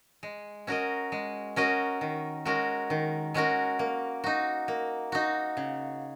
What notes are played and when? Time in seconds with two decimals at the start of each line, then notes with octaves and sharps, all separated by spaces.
0.23 G#3
0.67 C#4 F#4 A#4 D#5
1.12 G#3
1.56 C#4 F#4 A#4 D#5
2.01 D#3
2.45 G#3 C#4 F#4 A#4
2.90 D#3
3.34 G#3 C#4 F#4 A#4
3.79 A#3
4.24 D#4 F#4
4.68 A#3
5.12 D#4 F#4
5.57 C#3